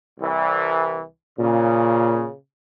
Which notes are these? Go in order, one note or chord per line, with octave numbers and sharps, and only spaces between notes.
C2 E3
A#2 C#3